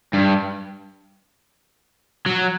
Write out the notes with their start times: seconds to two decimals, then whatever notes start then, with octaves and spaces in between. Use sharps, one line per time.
0.13 G2
2.26 F#3